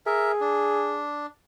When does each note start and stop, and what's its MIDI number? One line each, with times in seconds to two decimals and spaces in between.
0.06 1.04 68
0.06 0.32 70
0.06 0.32 76
0.41 1.26 62